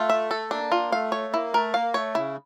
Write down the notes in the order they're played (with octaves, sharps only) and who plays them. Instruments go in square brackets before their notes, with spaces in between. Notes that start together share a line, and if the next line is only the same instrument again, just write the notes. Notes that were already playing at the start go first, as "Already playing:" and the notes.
Already playing: [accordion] A3 [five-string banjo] F4
[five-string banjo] E5
A4
[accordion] A#3 [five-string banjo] D4
[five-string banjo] F4
[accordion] A3 [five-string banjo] F5
[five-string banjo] C#5
[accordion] A#3 [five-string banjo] E4
[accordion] A3 [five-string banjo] A#4
[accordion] A#3 [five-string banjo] F5
[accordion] A3 [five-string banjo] C#5
[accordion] C#3 [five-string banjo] E4